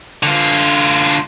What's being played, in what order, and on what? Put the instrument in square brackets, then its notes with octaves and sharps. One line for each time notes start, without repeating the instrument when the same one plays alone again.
[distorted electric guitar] D3 F4